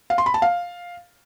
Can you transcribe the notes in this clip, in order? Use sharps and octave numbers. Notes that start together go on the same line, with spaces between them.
F5
C6
B5
A5
F5